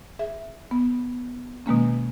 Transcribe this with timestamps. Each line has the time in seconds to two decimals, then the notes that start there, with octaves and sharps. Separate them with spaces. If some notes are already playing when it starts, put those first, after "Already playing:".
0.19 G#4 E5
0.71 B3
1.66 B2 D#3 G#3 A#3 C#4